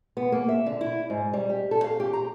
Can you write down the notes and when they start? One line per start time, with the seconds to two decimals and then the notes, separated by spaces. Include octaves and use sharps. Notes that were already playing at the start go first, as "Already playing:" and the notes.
0.17 B3
0.32 A#3
0.49 E5
0.66 D3
0.81 E4
1.10 G#2
1.33 G3
1.49 G4
1.71 A4
1.84 F5
2.00 G4
2.13 A#5